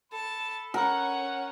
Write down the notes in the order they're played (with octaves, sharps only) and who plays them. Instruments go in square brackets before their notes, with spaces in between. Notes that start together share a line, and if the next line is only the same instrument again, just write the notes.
[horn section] A4 B5 [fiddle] A5
[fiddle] C#4 [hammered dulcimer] A#4 [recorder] F#5